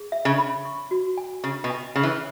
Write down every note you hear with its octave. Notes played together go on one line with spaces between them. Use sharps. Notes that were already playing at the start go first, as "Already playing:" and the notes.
Already playing: G#4
E5
C#3
B5
C#6
F#4
G#5
C#3 C#6
B2
G#5
C#3 C#5
E3